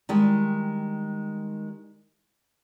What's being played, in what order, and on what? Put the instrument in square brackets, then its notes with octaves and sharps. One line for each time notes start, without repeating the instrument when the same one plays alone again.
[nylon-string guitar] D#3 G3 G#3